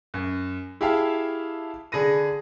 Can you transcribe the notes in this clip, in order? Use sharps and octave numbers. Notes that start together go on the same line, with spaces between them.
F#2
E4 G4 G#4 E5 F5 A5
D3 G#4 B5 A#6 D#7